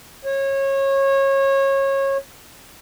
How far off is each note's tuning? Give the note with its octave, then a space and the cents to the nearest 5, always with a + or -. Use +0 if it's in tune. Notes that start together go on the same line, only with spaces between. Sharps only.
C#5 -25